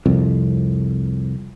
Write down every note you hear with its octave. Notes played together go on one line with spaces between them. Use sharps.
C2 F2